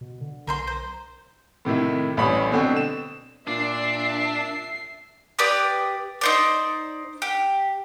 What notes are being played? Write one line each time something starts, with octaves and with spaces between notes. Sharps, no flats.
B2
D3
B1 A#4 C5 C6
C5
A2 C3 D#3 E4
A1 A2 G3 C#4 B5 D#6
B2 D3 C4
E7
A#2 D4 E5 C7
G4 B4 D5 D#6
D#4 C5 D5
G4